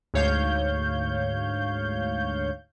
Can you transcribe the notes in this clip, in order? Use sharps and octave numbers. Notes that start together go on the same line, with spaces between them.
D2 G#2 C#5 F5 G6